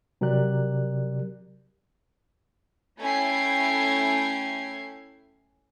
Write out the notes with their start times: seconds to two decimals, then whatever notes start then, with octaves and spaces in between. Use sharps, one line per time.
0.21 C3 F#3 G4 A#4 D5 F#6
3.00 A3 C#4 E4 G5 G#6 C7